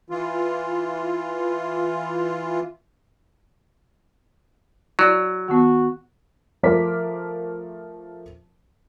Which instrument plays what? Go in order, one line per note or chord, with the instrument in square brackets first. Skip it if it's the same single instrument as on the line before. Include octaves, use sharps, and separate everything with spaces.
[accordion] E3 F4
[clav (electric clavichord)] F#3 [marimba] E4 D5 A6
[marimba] D#3 B3 [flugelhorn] F#4
[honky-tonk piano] F3 A3 A#4 C5 D6 B6